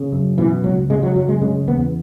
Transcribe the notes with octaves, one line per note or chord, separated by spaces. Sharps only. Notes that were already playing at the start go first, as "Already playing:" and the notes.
Already playing: C#3
F#2
B2 E3
C#2 F#3
C#3 G#3
F#3
F#2 F#3
G#3
C#3 G#3
E2 B3